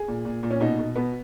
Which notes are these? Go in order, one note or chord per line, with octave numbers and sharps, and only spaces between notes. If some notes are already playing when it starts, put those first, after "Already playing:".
Already playing: G#4
A#2
A#2
A#2
C#4
B2 D#4
B2
B2 B3